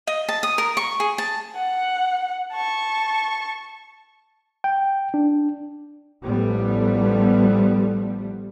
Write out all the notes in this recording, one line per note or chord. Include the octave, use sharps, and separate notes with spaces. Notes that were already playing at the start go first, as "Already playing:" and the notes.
D#5
A5
D#6
A#4
C#6
G#4
A5
F#5
A5 C#6
G5
D4
A1 F3 G3 A3 B3